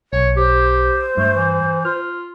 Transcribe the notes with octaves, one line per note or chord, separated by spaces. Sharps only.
B1 C#5
G4 C5
G2 A3
E3
F4 F6